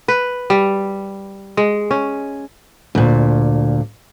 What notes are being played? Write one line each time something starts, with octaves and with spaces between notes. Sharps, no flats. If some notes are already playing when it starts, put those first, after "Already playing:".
B4
G3
G#3
C#4
D2 A#2